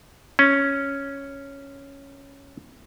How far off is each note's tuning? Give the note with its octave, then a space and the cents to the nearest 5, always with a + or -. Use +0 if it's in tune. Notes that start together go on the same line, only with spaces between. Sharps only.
C#4 +0